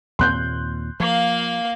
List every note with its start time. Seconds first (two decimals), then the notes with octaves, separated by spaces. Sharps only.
0.19 D#2 A#2 C4 C6 F#6 G6
1.00 F3 A#3 F5